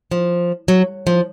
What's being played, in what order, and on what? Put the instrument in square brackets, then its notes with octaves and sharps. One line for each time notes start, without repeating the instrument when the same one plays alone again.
[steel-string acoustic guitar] F3
F#3
F3